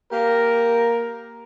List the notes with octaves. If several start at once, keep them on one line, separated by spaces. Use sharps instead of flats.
A#3 G4 A#4